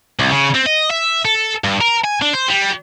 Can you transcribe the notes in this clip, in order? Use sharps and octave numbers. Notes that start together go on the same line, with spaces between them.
C2
C#3
C4
D#5
E5
A4
G2
A#4
G#5
D4
C5
G3